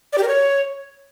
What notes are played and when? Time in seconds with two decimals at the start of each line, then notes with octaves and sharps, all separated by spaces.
0.13 D5
0.18 G4
0.23 A#4
0.28 C#5